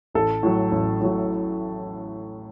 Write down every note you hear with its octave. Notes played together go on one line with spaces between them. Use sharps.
A1 A4
A2 F#3
A1
A2 F#3